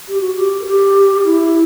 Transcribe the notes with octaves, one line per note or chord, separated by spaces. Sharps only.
G4
F#4
G4
A#4
G4
E4